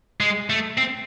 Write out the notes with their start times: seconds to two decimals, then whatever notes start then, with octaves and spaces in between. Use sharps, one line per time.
0.21 G#3
0.50 A3
0.78 C4